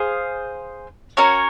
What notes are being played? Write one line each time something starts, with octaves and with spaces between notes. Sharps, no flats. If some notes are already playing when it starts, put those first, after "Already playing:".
Already playing: G#4 C5 F5
C#4 F#4 A#4 C#5